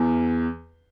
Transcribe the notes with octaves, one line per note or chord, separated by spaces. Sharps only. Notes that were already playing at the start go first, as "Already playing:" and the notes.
Already playing: E2